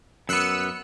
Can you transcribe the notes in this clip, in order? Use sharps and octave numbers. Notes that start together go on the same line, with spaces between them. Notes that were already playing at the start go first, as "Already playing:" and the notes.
F#2 B3 E6 F#6 C#7